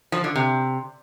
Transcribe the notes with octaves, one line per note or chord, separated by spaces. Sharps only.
F3
D3
C3